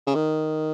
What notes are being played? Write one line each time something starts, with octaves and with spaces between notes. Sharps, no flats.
C#3
D#3